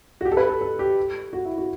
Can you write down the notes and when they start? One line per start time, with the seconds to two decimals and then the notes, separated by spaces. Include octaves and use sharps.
0.21 F#4
0.25 G4
0.32 A4
0.37 B4
0.49 A4
0.61 A4
0.79 G4
1.33 F#4
1.45 E4
1.58 F#4